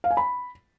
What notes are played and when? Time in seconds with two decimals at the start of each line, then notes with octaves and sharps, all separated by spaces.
0.04 F5
0.11 G#5
0.17 B5